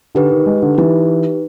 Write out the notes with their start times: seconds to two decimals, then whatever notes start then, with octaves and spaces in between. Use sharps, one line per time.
0.15 D3 D#4 G4 B4
0.31 D#3
0.46 G#3
0.62 D3
0.78 E3 D#4 G4 B4